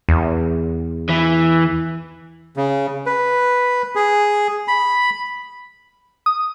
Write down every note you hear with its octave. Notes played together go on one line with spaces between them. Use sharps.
E2
E3
C#3
B4
G#4
B5
D#6